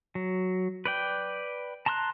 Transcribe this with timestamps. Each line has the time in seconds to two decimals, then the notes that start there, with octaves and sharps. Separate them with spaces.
0.15 F#3
0.85 B4 D5 G5
1.86 A5 A#5 C6 D#6 F#6